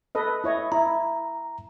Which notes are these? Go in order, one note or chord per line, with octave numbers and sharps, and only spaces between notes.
A4 B4 D#5
E4 C#5 D#5
E4 A#5